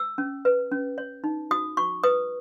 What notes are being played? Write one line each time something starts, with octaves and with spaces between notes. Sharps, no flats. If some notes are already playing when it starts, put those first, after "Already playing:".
Already playing: E6
C#4
B4
C#4
C#5
D#4
F#4 D#6
F#4 C#6
B4 D#6